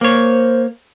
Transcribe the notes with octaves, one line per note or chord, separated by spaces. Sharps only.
A#3 C5 C#5